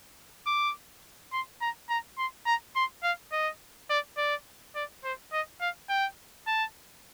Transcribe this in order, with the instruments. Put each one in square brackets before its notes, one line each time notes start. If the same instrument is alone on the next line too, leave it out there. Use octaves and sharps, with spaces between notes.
[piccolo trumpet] D6
C6
A#5
A#5
C6
A#5
C6
F5
D#5
D5
D5
D5
C5
D#5
F5
G5
A5